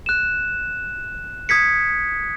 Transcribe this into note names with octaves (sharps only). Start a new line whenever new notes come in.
F#6 E7
D#6 G#6 B6 C#7